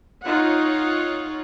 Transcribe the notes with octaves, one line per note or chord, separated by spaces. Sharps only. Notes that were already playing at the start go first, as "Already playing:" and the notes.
D#4 F4 C#5 F#5